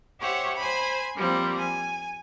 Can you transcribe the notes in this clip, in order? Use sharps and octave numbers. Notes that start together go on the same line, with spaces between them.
G4 C5 C#5 E5 F#5
C5 G#5 B5
F3 G3 A#3 C4
G#5